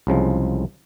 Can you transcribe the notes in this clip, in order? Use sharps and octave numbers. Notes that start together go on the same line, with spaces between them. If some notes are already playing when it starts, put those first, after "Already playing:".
C2 C#3 F3 G#3